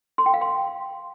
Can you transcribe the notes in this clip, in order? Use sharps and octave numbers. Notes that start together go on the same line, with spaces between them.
C6
G5
F5
C6